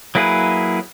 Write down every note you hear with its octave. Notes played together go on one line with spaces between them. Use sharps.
F#3 A#3 E4 G#4 B4